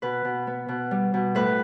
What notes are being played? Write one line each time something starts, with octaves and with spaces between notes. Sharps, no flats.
B2 B4
B2
B3
B2
G3
B2
A2 B4